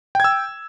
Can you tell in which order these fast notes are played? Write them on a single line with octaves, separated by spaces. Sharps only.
G5 G#6 E6